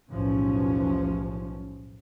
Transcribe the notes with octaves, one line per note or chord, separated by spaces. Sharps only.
B1 E2 A2 F3 G3 C#4